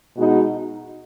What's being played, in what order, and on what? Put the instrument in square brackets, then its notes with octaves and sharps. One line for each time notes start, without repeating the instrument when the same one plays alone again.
[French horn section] B2 G#3 D#4 F#4